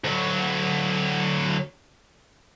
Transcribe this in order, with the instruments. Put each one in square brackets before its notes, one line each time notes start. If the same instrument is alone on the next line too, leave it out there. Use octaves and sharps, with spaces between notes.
[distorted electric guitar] D2 F#3